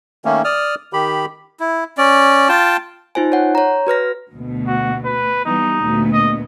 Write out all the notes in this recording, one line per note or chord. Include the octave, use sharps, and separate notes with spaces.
D#3 A3 A#3 C#4
D5 D#6 F6
D#3 G4 B5
E4
C#4 D5
F4 G5 A5
D#4 F4 C5 G#5
C#5 F#5
C#5 A#5
F#4 B4 F6 A#6
D2 B2
F#4
B4
E3 G3 B3 D#4
D2 A#2 B3
D#5